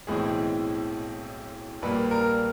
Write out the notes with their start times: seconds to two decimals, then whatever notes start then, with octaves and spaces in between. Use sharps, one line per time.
0.07 B1 A2 E3 G#3 C4 G#4
1.82 A#1 A#2 G3 A#3 B4
2.11 A#4